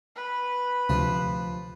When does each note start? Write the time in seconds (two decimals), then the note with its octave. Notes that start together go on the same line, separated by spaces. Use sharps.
0.15 B4
0.89 D2 C3 F3